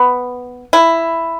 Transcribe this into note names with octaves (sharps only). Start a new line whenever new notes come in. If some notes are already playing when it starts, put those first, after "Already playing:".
Already playing: B3
E4